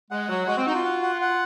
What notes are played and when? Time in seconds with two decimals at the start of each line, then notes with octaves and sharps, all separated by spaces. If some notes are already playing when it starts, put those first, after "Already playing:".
0.11 G#3 F#5
0.29 F#3 F#4
0.47 G#3 F#4
0.57 C4
0.66 D#4 F#4
0.75 F4
0.85 F#5
1.03 F#5
1.22 F#5